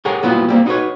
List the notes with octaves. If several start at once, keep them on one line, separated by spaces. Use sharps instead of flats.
G4 G#4 A#4 C#5 F#5 G#5
A#2 F#3 G3 B3 E4 F#4
G3 A#3 C4
D#4 E4 F#4 G#4 B4 C#5